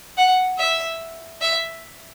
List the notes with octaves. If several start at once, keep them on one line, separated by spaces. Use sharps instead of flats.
F#5
E5
E5